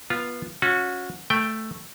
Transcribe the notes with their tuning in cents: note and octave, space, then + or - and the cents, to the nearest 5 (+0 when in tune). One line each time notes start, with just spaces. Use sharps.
B3 -20 F4 +0
C#4 +0 F#4 -30
A3 +0 G5 +0